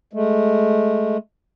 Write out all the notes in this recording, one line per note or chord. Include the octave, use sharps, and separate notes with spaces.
G#3 A3